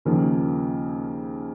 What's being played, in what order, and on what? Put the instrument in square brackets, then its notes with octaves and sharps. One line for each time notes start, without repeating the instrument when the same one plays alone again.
[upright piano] D#2 C#3 F3 A#3